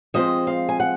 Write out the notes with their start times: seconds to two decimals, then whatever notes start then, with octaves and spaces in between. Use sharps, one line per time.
0.14 F3 G#3 C4 D#5
0.47 F5
0.69 G#5
0.80 F#5